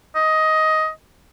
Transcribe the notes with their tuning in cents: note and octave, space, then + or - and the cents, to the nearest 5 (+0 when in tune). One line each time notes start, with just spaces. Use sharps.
D#5 +15